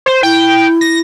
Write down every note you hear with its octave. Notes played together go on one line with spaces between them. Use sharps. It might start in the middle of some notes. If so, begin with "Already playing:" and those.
C5
E4 G5
A#6